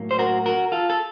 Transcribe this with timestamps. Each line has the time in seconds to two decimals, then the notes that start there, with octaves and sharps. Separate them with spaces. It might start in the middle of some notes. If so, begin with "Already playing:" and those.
Already playing: A2 F#3 A#3
0.11 C5
0.19 F#4 A#4
0.46 F#4 A#4
0.72 F4 A4
0.90 A4